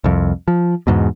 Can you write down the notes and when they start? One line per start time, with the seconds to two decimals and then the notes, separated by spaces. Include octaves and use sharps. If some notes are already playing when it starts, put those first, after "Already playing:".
0.04 C2 F2
0.48 F3
0.87 E2 G#2 B2